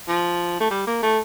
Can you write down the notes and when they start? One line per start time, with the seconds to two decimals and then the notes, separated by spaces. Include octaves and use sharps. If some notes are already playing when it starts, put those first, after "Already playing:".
0.08 F3
0.60 A3
0.71 G3
0.87 A#3
1.03 A3